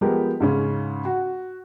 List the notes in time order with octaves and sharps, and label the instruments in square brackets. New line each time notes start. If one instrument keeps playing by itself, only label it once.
[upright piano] F3 G#3 B3 G4 A#4
G#2 C#3 C#4
F#4